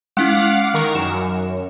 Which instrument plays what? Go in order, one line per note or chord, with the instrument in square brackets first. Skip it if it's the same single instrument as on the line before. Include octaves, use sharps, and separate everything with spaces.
[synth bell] G#3 C#4 E4 [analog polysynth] F5 F#5 D6
[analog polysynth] D#3 A#4 C#6
[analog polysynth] F#2 [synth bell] E7